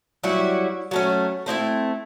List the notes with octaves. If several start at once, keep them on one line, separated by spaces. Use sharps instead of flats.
F#3 G3 E4 F#4
F#3 A3 C#4
A3 C4 D#4 E4